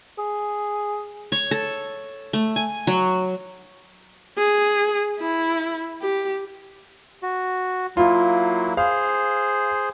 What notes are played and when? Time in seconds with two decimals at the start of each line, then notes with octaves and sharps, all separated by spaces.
0.18 G#4
1.32 C#5
1.51 A4
2.33 A3
2.56 G#5
2.87 F#3
4.38 G#4
5.19 E4
6.02 G4
7.23 F#4
7.97 F#3 A#3 E4 F4
8.77 G#4 C5 F5